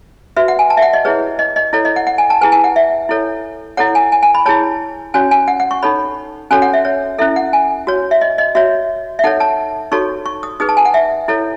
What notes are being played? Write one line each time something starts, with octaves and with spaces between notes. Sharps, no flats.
F#4 B4 E5
F#5
G#5
A5
E5
F#5
D#5
E4 G#4 B4 C#5
D#5
D#5
E4 A4 C#5
D#5
F#5
F#5
G#5
A5
E4 G#4 B4 G#5
G#5
F#5
E5
E4 A4 C#5
E4 A4 C#5 F#5
G#5
G#5
G#5
B5
E4 G#4 C#5 A5
C#4 F#4 C#5 G#5
G#5
F#5
F#5
C#6
D#4 A4 C#5 B5
C#4 F#4 A4 C#5 G#5
F#5
E5
C#5
C#4 E4 A4 E5
F#5
G#5
F#4 C#5
E5
D#5
D#5
F#4 C#5 E5
E5
D#4 A4 C#5 F#5
A5
D#4 F#4 A4 C#5 C#6
C#6
D#6
D#4 G#4 B4 D#6
A5
G#5
F#5
E5
E4 A4 C#5